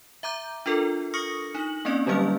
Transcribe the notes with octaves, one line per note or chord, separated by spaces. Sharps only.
E5 A#5 D6 G6
D4 F4 A4 A#4
C#6 D#6 F6 A#6 C#7
D#4 F#7
A#3 C4 C#4 D5
D3 F#3 G3 A#3 C#4 F6